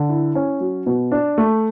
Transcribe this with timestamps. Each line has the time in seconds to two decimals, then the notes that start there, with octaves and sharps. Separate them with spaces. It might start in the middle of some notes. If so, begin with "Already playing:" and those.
Already playing: D3
0.09 E4
0.35 C#4
0.60 F#3
0.86 B2
1.12 D4
1.38 A3